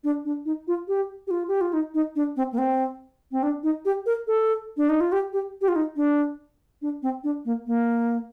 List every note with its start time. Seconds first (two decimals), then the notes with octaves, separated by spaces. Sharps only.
0.04 D4
0.25 D4
0.45 D#4
0.68 F4
0.88 G4
1.27 G4
1.31 F4
1.48 G4
1.61 F4
1.73 D#4
1.94 D#4
2.16 D4
2.36 C4
2.53 A#3
2.58 C4
3.32 C4
3.43 D4
3.63 D#4
3.85 G4
4.06 A#4
4.27 A4
4.77 D4
4.89 D#4
5.01 F4
5.12 G4
5.33 G4
5.62 G4
5.68 F4
5.76 D#4
5.96 D4
6.82 D4
7.03 C4
7.24 D4
7.45 A#3
7.67 A#3